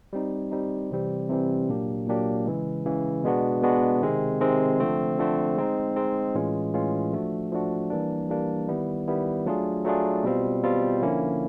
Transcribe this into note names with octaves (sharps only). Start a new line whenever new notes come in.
G3 C4 D#4
G3 C4 D#4
C3 E3 G3 C4
C3 E3 G3 C4
A#2 F#3 A#3 D4 G4
A#2 F#3 A#3 D4 G4
C#3 E3 G#3
C#3 E3 G#3
B2 G#3 B3 D4 F#4
B2 G#3 B3 D4 F#4
C3 D#3 G#3 C4
C3 D#3 G#3 C4
D3 F3 A3 C4
D3 F3 A3 C4
G#3 C4 D#4
G#3 C4 D#4
A2 E3 G#3 C#4 F4
A2 E3 G#3 C#4 F4
F3 A3 D4 F#4
F3 A3 D4 F#4
E3 G3 A#3 D4
E3 G3 A#3 D4
D#3 G3 B3 E4
D#3 G3 B3 E4
F#3 A3 D4 F4 G#4
F#3 A3 D4 F4 G#4
B2 G3 C4 F4
B2 G3 C4 F4
D3 F3 A#3 C#4 E4